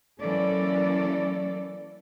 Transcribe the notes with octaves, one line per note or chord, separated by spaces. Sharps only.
E3 F#3 A#3 C#4 A4 D5